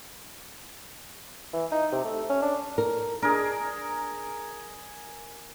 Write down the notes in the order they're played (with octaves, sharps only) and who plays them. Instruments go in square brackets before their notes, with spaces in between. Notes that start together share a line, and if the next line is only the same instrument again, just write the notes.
[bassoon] E3
D#4
C3
A3
C#4
D4
[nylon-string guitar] A#4
[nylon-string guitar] D4 [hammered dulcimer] G#4 A#4